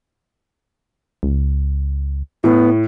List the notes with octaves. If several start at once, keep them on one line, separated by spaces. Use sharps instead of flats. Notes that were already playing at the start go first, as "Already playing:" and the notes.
C#2
A2 B3